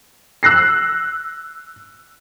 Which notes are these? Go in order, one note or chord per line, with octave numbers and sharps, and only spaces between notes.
E6 F#6 A#6 C7